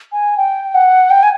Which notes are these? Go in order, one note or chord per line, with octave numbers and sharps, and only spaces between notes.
G#5
G5
F#5
G5
G#5